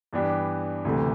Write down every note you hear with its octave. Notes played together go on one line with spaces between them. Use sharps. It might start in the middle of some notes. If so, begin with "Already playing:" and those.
G2 E3 B3 D4 G4
D2 C3 E3 A3